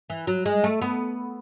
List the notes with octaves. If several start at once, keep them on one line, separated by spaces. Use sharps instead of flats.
E3
F#3
G#3
A3
B3